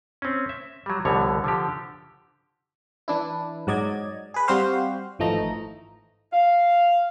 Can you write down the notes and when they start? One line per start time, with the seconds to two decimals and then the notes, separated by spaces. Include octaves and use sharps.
0.22 C4 C#4
0.49 E5
0.86 F#3 G3
1.05 C2 B2 D3 F3 C#5
1.44 D3 F3 G4
3.08 E3 D4 E4
3.67 G#2 F#3 D5 D#5 G#6
4.34 G#4 B4
4.48 G3 C4 F#4 G4 C5 F5
5.19 G#1 E3 F3 A3 D#4 A#5
6.33 F5